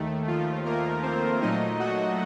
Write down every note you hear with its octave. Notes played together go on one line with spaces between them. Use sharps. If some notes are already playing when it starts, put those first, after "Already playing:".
Already playing: D#2 D#3 A3
F3 F4
A#3 A#4
C4 C5
A#2 F#3 A3 D#4 D#5
F#4 F#5